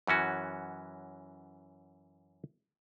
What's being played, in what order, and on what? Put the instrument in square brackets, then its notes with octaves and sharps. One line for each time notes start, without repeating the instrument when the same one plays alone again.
[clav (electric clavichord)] F#2 E3 C#4 F#4